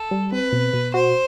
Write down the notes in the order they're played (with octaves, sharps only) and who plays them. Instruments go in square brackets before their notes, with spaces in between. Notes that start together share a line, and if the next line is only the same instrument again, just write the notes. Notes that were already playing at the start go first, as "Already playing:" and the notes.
Already playing: [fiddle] A4
[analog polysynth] G3
[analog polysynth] C4 [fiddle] B4
[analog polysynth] B2
B2
[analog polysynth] F#4 [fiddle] C5